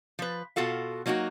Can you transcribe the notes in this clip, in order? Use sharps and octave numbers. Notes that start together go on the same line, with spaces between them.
F3 B4
B2 F4 F#4 A4 F5
F#3 A#3 D#4 F4 F#4